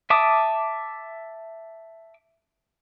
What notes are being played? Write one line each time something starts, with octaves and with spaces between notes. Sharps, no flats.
E5 A5 D6 D#6